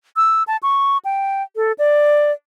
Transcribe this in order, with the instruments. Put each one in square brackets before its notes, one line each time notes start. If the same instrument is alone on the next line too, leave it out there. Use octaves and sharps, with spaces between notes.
[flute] E6
A5
C#6
G5
A4
D5